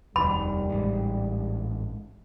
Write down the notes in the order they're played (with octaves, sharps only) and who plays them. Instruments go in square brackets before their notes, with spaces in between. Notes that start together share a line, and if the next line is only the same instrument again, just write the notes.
[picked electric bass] F1 D#2 D#3 [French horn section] G3 [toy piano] B5
[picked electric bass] A1 G#2